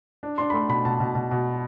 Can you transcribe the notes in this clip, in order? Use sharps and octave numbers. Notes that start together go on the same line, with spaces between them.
D4
D4 C6
B5
A3 C6
B2 B5
B2 A5
B2
B2
B2